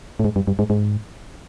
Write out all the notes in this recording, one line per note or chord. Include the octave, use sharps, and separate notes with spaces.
A2
G#2
G2
G2
G#2
G#2